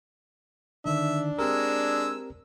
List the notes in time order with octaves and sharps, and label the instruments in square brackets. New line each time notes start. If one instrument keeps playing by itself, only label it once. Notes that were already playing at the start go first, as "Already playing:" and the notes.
[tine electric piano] D3 D#3 [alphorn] D4 [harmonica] E5
[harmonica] G#3 E6 [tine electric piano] C4 G4 A#4